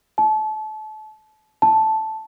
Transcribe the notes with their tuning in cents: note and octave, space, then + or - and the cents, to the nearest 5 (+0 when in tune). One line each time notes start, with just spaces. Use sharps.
A5 -30
A5 -5